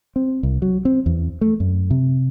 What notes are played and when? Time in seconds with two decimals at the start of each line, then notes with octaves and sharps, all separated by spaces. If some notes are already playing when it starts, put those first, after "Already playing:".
0.16 C4
0.43 C2
0.62 F#3
0.85 C4
1.06 E2
1.41 A3
1.60 F#2
1.90 C3